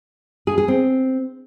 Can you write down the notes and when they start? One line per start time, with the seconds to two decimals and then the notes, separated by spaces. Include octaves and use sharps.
0.47 G#4
0.58 G#4
0.68 C4